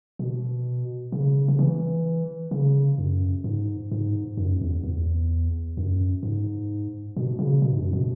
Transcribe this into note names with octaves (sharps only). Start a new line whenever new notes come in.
B2
C#3
C#3
E3
C#3
F#2
G#2
G#2
F#2
E2
E2
F#2
G#2
B2
C#3
B2
G#2
F#2
B2